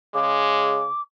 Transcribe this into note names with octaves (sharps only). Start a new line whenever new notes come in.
C#3 G#3 D6